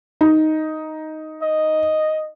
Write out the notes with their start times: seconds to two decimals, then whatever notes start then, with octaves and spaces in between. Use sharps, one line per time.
0.21 D#4
1.42 D#5